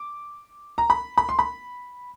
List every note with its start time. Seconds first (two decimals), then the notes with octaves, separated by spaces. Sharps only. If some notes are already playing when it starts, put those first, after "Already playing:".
Already playing: D6
0.78 A#5
0.90 B5
1.18 B5
1.29 C6
1.39 B5